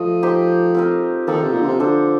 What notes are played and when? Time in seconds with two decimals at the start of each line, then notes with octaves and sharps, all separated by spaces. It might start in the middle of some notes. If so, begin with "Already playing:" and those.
Already playing: F3 A3 D#5
0.22 D#4 G4 C5
0.75 C4 F4 A#4
1.27 D#3 F3 A#3 D#4 A4
1.41 C3
1.53 A#2
1.61 D3
1.67 C3
1.80 D3 D4 A4 C5